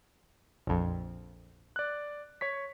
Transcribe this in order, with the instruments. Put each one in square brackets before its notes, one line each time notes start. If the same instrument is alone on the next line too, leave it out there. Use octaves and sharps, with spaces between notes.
[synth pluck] A#1 F2
[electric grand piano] D5 F#6
C#5 C#6 B6